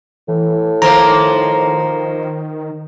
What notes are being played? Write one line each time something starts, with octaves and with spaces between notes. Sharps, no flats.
A2 E3
D#3 F3 A#3 C5 A#5